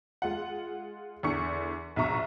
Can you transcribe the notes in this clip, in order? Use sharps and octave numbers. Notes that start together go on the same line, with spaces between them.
G#3 F4 F#5
E2 D3 C#6 C#7
A#1 B2 E5 A#5 C#6